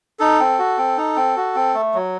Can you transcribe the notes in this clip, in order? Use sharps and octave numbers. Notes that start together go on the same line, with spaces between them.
D#4 A4
C4
F#4
C4
D#4
C4
F#4
C4
A3
F#3